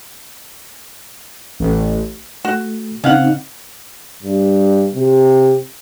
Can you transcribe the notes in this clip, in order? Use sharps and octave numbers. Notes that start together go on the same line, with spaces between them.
A1
A3 F#4
C#3 C4 C#4 D#4 F5 F#5
G2
C3